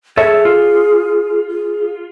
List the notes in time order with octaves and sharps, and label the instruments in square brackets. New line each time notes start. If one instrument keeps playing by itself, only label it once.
[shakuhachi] G#4 [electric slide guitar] A4 C#5 E5
[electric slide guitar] F4
[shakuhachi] G#4